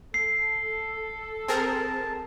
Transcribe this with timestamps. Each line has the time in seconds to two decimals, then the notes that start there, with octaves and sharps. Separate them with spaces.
0.14 A4 C7
1.48 C4 G#4 A#4 A5